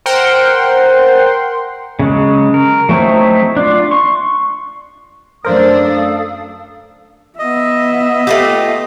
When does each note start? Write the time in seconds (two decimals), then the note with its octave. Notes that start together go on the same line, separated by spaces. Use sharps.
0.06 A#4 C5 F#5 G5 C6
1.99 C#3 F#3 G#3
2.54 A#4
2.89 F#3 A3 C4 D#4 E4
3.57 D4 F4
3.91 C6 C#6
5.45 F#2 A3 D4 A4 A#4 C5 F5 D#6
7.39 B3 D#5 E5
8.27 A3 F4 G4